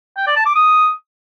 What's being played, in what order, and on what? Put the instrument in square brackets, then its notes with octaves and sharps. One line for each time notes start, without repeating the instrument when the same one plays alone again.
[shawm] G5
D5
A5
D6
D#6